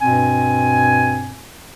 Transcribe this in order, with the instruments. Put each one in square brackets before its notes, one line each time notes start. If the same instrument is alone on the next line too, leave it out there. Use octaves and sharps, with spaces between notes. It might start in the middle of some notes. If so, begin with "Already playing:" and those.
[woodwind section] G2 B2 C4 G#5